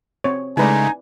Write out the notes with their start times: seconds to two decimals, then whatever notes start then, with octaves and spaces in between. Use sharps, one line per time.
0.24 C4 C#5
0.57 C#3 G#3 A3 D#4 E4 B4 D5 G#5